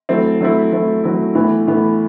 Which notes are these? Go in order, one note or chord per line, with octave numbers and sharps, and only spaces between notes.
F#3 A3 C4 E4
F#3 A3 C4 E4
F#3 A3 C4 E4
F#3 A3 C4 E4
A2 E3 B3
A2 E3 B3